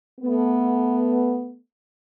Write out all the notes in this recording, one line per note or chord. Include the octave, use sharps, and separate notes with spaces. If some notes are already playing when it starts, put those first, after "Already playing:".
A3 B3